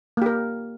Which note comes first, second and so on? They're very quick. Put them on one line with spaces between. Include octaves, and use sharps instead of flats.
A#3 G4 A#4